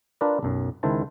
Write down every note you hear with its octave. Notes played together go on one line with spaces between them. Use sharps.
D4 F4 A#4 B4 D5
B1 F#2
C#2 D#3 E4 C5 A5